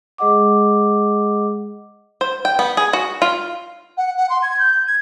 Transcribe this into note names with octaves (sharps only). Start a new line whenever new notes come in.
G#3 G#4 D#5 F#5 D6
C5
G5
B3
G#4
F#4
F4
F#5
F#5
C6
G#6
G6
G#6